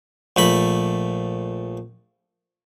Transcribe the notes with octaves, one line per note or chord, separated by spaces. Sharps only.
A#1 A3 B5